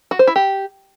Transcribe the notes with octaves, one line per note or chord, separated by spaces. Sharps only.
F#4
C5
E4
G4